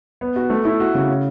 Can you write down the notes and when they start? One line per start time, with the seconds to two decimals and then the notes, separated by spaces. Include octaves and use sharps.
0.21 B3
0.36 F#4
0.50 A3
0.65 E4
0.80 F#4
0.95 C#3
1.09 C#4